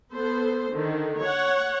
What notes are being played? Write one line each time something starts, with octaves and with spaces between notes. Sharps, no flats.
B3 A4 C5
D3 D#3
C#5 F#5